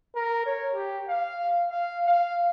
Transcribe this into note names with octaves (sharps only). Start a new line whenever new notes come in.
A#4
C#5
G4
F5
F5
F5